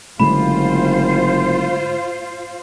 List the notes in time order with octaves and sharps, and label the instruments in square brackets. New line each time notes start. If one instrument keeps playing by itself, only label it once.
[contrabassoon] F#1 [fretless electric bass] D3 G#3 A3 [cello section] F4 C5 [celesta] B5